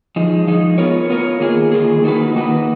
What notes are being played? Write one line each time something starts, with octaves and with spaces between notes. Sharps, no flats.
F3 G#3 D#4
F3 G#3 D#4
B3 F4 A#4 C#5
B3 F4 A#4 C#5
D#3 A#3 F4 G#4
D#3 A#3 F4 G#4
D#3 A#3 D#4 F#4 B4
D#3 A#3 D#4 F#4 B4